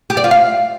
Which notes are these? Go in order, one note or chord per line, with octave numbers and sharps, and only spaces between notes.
G4
D5
F4
F5